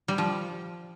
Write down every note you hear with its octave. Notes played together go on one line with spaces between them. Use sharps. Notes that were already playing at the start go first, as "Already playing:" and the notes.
G3
F3